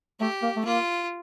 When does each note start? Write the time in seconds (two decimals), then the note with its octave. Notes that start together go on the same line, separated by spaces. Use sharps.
0.20 A3 G4
0.42 A#3
0.56 A3
0.65 A#3 F4